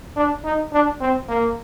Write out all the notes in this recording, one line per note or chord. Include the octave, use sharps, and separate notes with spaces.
D4
D#4
D4
C4
A#3